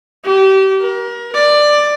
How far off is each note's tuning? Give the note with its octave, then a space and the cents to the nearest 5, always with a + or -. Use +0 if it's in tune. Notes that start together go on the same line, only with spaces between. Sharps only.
G4 -30
A#4 +30
D5 +10